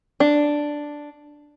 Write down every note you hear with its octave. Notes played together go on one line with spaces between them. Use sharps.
D4